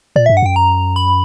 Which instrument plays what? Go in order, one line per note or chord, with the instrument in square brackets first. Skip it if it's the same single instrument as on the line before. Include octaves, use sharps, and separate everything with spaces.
[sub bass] A#2 [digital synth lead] D5
[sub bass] G2 [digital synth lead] E5
[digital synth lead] F#5
[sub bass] F#2 [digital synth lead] G5
[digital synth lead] A#5
B5